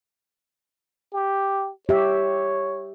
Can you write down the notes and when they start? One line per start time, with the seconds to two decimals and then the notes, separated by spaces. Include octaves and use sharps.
1.13 G4
1.89 G4 C#5 E5